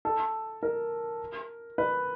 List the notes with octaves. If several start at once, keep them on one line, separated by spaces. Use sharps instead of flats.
A4
A#4
B4